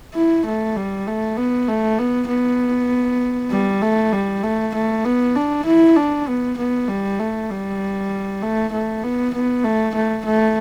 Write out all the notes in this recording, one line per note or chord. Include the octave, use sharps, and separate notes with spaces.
E4
A3
G3
A3
B3
A3
B3
B3
G3
A3
G3
A3
A3
B3
D4
E4
D4
B3
B3
G3
A3
G3
A3
A3
B3
B3
A3
A3
A3